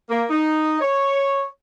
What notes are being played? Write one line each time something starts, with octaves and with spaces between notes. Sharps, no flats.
A#3
D#4
C#5